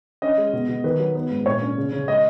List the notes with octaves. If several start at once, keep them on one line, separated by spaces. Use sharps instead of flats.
C#4 D#5
G#3
B2
B2
D#3 B4
F#3
B3
G#2
A#2 C#5
C#4
C#3
C#3
G#3 D#5